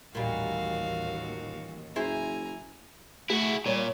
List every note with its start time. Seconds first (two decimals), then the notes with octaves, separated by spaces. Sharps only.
0.15 A1 D#2 A#2 G3 F#4 F5
1.96 F#1 E4 G#4 C5 G#5 A#5
3.30 A3 E4 F#4 G#4
3.66 A#2 G3 C#5